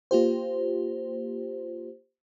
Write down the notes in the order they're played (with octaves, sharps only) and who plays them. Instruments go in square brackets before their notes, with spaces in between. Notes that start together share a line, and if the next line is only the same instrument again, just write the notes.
[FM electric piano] A#3 F4 G4 C5